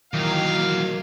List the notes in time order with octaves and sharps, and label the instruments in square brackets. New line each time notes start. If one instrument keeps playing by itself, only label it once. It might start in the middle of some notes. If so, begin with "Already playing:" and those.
[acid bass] D#3 [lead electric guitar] E3 F#3 [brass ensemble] A#3 F5